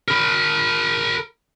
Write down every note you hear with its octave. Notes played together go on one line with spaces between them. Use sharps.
A#4 B5